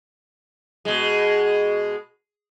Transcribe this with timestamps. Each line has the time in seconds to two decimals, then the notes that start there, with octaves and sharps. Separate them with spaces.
0.85 B2 G#3